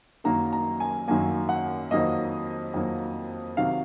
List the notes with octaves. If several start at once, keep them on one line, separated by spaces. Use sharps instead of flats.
F#2 D#3 F#3 A#3 A#5
A#5
G#5
F#2 D#3 F#3 A#3 G#5
F#5
F2 D#3 F#3 A#3 D#5
F2 D#3 F#3 A#3
C3 D#3 F#3 F5